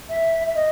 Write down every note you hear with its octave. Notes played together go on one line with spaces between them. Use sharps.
E5
E5
D#5